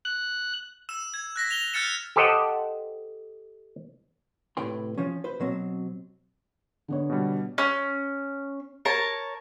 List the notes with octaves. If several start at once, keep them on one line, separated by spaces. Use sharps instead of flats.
F#6
E6 E7
G#6
F#6 A#6 B6
F7 G7
F6 G6 A6 C#7 E7
G4 A4 C5 D#5 F#5
A2 C3 B4 G5 C6
F3 C#4
B4 C5
B2 F#3 C4
D3 B3 C#5
B2 G3
C#4
A#4 C#5 A5